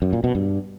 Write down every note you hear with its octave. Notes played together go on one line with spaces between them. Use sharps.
F#2
A#2
B2
G2